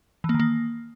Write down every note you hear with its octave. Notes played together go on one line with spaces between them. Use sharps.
E3
A#3
D#3
A#3